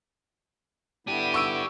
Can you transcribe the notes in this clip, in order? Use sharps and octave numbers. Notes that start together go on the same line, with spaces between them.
D3 B3 D4 E4 G4 D#7
C#6 E6 D7